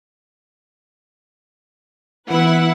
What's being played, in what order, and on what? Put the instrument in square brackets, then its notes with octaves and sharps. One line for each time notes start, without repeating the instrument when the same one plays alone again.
[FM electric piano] E3 B3 [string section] E4 B4 F#5